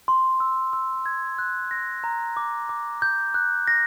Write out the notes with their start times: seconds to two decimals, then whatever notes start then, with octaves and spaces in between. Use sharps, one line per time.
0.08 C6
0.40 E6
0.73 E6
1.06 G#6
1.39 F#6
1.71 A#6
2.04 A#5
2.37 D6
2.69 D6
3.02 G6
3.34 F#6
3.68 A#6